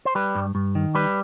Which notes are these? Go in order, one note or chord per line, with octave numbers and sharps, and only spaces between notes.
C5
G3 B4
G2
G2
D#3
G3 B4